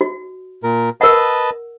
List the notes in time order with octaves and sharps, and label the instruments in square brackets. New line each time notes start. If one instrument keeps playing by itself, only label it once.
[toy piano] F#4
[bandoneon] A#2 A#4
[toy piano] A#4 F#5 [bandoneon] B4 D#5 A5